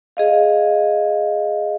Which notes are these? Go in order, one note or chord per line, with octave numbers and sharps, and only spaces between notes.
G#4 D#5 F5